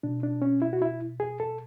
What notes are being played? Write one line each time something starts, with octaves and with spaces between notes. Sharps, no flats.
B2 D4
D4
C#4
E4
F#4
E4
G#4
A4